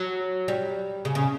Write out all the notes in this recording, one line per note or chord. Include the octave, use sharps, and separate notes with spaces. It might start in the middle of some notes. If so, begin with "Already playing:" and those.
Already playing: F#3
G3
C#3
C#3